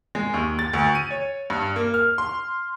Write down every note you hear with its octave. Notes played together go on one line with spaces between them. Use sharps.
G#3
D#2
A6
D2
D#7
C#5
G2
A#3
F6
C6